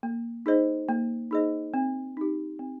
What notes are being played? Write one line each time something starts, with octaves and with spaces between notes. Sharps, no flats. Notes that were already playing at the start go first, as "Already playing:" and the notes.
A#3
D#4 G#4 C5 D#5
A#3
D#4 G#4 C5 D#5
C4
D#4 G4
C4